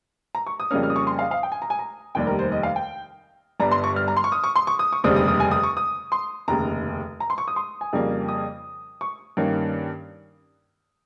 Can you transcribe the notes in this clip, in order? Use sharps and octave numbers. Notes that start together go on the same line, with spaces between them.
A#5
C#6
D#6
F2 C#3 G3 A#3 C#4 F6
F6
D#6
C#6
C6
F5
F5
G5
G#5
A#5
G#5
A#5
F1 D#2 D#3 G3 G5
A#4
C5
D#5
F5
G5
G1 G2 G3 A#5
C6
C#6
F6
A#5
C6
C#6
D#6
C#6
C6
C#6
D#6
C#6
F1 D#2 C#3 G3 C4 D#6
D#6
D#6
G#5
D#6
C#6
D#6
C6
F1 D#2 C#3 A#5
A#5
C6
C#6
D#6
C6
G#5
F2 C#3 G3 A#3
D#6
C#6
G2 D#3 A#3 C#4